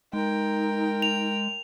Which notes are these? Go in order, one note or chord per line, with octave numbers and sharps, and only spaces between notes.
G#3 D#4 A#4 G5
F7